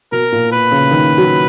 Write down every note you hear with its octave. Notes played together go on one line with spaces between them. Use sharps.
B2 A#4
A#2
B4
C#3
D#3
F#3